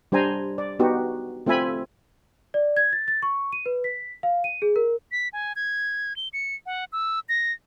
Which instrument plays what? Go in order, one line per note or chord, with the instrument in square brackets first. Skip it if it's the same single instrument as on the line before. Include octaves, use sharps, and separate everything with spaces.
[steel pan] G3 D4 C5 G#5 A#5
D5
B3 D#4 F#4 G4
A3 C4 F4 E5 G#5 B5
[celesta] D5
G#6
A6
A6
C#6
D#7
B4
B6
F5
D#7
G#4
A#4
[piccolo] B6
G#5
G#6
G7
C#7
F#5
E6
A#6